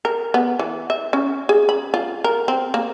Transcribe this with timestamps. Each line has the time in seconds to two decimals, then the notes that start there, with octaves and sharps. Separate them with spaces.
0.05 A#4
0.34 B3
0.59 E3
0.90 E5
1.13 C#4
1.49 G#4
1.69 B5
1.94 F4
2.24 A#4
2.48 C4
2.74 A#3